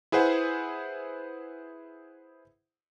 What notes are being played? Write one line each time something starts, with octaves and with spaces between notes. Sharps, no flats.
E4 G#4 B4 C5 F#5